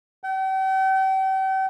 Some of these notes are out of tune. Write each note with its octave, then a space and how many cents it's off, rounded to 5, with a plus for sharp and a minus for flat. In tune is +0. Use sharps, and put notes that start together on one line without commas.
G5 -40